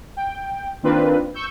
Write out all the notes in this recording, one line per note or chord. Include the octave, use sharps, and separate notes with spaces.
G5
D#3 A#3 C4 D4 F4 B4
C#6 E6 G6